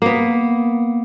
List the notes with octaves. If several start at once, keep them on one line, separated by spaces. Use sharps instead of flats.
A#3 B3